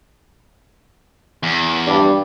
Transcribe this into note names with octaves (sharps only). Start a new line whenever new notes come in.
E2
G2 D5